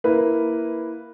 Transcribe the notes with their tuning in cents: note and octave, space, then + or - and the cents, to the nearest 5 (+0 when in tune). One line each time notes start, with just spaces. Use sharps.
A#3 +0 E4 +0 B4 +0